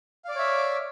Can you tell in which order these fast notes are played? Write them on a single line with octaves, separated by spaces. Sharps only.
F5 D5 D6 C#5 E5